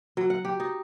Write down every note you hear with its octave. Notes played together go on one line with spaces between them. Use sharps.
F#3
F#5
G4
D#4